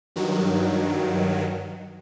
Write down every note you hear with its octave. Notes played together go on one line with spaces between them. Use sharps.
G2 D#3 F#3